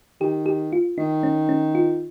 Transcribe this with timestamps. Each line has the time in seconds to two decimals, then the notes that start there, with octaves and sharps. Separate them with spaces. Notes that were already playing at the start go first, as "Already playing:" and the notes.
0.20 D#3 G4
0.46 G4
0.73 F4
0.98 D#3 D#4
1.23 C#4
1.49 C#4
1.75 F4